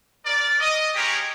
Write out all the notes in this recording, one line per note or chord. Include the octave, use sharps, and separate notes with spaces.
A#4 D5
D#5
G#3 C#4 G4 A#4 C#5